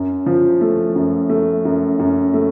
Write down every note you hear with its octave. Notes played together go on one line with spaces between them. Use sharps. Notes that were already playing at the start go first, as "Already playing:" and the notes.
Already playing: F#2
F3
A3
F#2
A3
F#2
F#2
A3